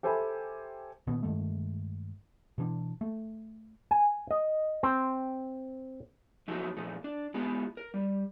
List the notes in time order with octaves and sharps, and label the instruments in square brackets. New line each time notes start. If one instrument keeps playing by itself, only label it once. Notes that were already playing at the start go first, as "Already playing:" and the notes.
[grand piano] G4 A4 C5 E5 G#5 B5
[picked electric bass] A#2 D#3 B3
G2 D#3 G#3 A3
B2 E3 C#4 D4
A3
[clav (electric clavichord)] G#5
D#5
C4
[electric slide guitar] F3 F#3 A3 D#4 F#4
A#2 F3 A3
D4
G#3 B3 F4 G4
A#4
G3